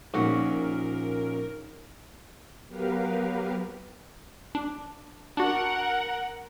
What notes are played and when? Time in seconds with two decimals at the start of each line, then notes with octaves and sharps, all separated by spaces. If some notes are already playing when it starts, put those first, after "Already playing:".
0.14 A#1 A#2 C#4 D#4 F#4 A#4
2.68 F#3 B3 G4 A#4 B4 F5
4.55 D4
5.37 D4 F#4 A#4 F#5